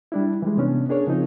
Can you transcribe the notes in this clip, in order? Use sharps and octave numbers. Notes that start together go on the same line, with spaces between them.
G3 D4 E4
E3 G3 G#3
C3 B3 C#4 D4
D4 G#4 A#4 C#5
C#3 F3 C4 D#4